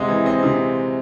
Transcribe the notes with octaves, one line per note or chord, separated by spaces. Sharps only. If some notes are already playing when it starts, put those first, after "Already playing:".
Already playing: C3 G#3 C4 D#5 E5 F#5
E3
C4 D#5
C3